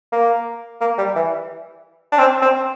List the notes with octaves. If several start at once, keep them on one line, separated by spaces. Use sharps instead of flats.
A#3
A#3
G3
E3
D4
C4
C4